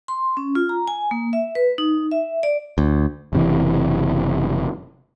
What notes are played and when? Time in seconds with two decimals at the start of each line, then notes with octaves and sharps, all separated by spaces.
0.08 C6
0.37 C#4
0.55 F4
0.69 A#5
0.88 G#5
1.11 A#3
1.33 E5
1.55 B4
1.78 D#4
2.11 E5
2.43 D5
2.78 D2
3.33 F#1 C3 E3